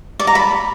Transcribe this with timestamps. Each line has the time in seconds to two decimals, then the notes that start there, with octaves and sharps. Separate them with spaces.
0.20 D5
0.27 A#5
0.35 B5